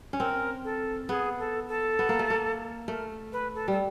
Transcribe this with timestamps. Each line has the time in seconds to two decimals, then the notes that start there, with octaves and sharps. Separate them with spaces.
0.13 C#4
0.20 C4 A#4
0.64 A4
1.09 B3 G#4
1.39 A4
1.68 A4
1.99 B3
2.09 A#3
2.19 A3
2.30 A#3
2.88 A3 A#4
3.33 B4
3.55 A4
3.68 G3 A4